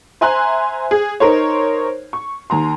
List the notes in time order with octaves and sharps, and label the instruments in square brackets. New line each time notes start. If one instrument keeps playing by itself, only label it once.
[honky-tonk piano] C5 E5 G#5 A#5 C6 F#6
G#4
D#4 A#4 C5 C#5
C#6
D#2 A#5 C6